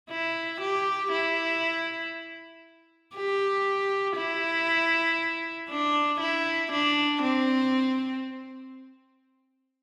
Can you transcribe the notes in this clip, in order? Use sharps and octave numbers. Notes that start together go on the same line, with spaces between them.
E4
G4
E4
G4
E4
D4
E4
D4
C4